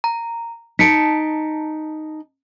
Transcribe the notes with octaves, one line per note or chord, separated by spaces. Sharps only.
A#5
D#4 A5 B6 C#7 D7